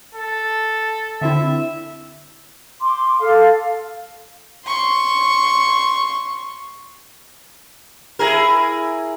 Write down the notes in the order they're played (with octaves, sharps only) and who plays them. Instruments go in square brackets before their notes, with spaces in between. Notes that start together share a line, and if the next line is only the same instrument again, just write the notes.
[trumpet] A4
[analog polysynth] D3 C4 E4 [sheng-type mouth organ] E5
[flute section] C6 D6
A4 F5
[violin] C6 C#6
[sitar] E4 G#4 A#4